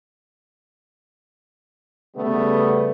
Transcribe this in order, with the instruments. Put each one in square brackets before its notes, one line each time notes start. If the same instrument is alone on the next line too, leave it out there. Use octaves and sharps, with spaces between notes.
[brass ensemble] C#3 G3 A3 B3